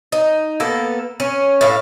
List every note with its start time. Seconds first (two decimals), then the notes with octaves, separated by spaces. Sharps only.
0.12 D#4
0.60 A#3 B3 A4
1.20 C#4
1.61 A2 E5 F5